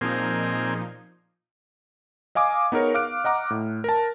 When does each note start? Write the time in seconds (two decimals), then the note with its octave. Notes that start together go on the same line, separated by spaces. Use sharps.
0.01 A#2 F3 A#3 C4 D#4 G#4
2.35 D#5 F5 G#5 D6 D#6
2.72 B3 D#4 G#4 A#4 C#5
2.94 F5 D6 F6 F#6 D7
3.24 D#5 F#5 A#5 D6
3.50 A2
3.84 A#4 A5